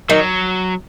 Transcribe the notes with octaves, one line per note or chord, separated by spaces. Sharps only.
D#3 F#3 D#4